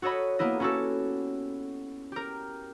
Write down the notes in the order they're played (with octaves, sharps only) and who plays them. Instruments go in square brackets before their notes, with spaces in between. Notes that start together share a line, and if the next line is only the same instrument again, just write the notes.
[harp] F#4 A4 C#5 D#5 B5
A#3 B3 E4 D#5
C#4 E4 F#4 G4 A4
G4 A#4